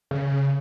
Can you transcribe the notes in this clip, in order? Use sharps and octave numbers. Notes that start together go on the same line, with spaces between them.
C#3